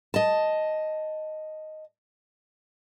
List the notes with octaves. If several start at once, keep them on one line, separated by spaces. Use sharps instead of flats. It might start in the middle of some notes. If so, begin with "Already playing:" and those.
D#5 A5